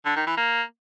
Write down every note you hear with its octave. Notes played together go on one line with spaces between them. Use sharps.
D3
D#3
E3
A#3